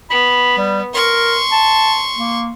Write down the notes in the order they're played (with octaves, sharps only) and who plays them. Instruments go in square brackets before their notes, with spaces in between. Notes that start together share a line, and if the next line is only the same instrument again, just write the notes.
[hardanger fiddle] B3 [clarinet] B5
[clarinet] G3
[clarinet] A#4 [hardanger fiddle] C6 C#6
[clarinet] A5
A#3